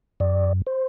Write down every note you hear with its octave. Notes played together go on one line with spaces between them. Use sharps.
F#2 D5
C5